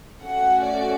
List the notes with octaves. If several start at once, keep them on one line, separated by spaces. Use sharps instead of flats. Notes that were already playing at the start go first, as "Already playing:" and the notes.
A3 C#4 F#4 F#5
D5